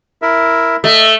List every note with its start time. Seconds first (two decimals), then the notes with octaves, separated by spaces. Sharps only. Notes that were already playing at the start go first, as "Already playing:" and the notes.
0.22 E4 A#4 E5
0.84 A3 D#5